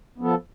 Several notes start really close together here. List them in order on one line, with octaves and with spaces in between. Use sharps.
B3 F3 A4